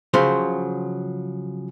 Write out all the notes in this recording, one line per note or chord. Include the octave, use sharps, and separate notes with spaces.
C#3 F3 F#3 C5